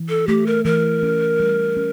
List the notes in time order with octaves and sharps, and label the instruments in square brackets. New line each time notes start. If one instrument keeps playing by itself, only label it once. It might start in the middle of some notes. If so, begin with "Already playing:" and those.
Already playing: [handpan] E3
[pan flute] A4
[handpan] A3 [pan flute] G4
[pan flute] A#4
[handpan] E3 [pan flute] A#4
[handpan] C#4
G3
C#4